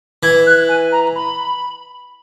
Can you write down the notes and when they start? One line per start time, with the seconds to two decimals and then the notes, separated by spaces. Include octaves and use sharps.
0.23 E3 G#6
0.47 F#6
0.69 G#5
0.92 A#5
1.16 B5